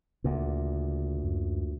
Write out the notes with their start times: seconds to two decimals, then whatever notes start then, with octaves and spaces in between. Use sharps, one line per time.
0.24 D2 A#2 C#3
1.23 F#2